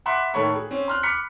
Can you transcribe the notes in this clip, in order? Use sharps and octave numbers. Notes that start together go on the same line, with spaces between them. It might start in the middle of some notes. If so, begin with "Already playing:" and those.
E5 F#5 B5 C6 D6 F#6
A2 D#3 A4 C#5 B5 C#6
G#4
C4 C#4
C6 F6 F#6
B5 D6 F6 F#6 B6 C#7